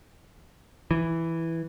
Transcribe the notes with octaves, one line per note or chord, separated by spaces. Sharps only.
E3